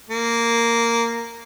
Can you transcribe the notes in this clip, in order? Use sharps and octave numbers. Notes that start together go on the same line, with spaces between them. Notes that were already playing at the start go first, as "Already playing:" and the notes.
A#3